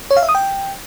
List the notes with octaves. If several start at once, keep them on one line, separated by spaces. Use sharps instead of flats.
C#5
F5
E5
D#6
G5